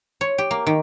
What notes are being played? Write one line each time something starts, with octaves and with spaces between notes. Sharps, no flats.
C#5
G4
A#3
D#3